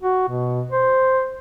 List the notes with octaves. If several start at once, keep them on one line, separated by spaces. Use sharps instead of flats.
F#4
B2
C5